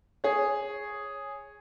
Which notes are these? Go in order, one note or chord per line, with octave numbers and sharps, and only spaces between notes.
G#4 C#5